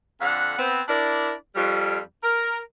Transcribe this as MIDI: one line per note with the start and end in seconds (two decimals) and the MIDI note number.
0.21 0.54 41
0.21 0.54 50
0.21 0.54 78
0.57 0.80 59
0.57 0.80 60
0.88 1.32 62
0.88 1.32 64
0.88 1.32 70
0.88 1.32 74
1.55 1.97 41
1.55 1.97 55
2.22 2.58 70